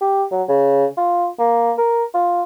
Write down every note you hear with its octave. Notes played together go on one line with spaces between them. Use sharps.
G4
F#3
C#3
F4
A#3
A#4
F4